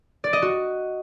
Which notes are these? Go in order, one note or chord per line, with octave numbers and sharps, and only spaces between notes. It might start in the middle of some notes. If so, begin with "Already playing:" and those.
D5
D#5
F#4